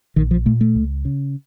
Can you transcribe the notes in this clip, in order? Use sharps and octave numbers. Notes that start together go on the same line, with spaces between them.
A#1 D#3
F3
A#2 A3
A3
C#2
C#3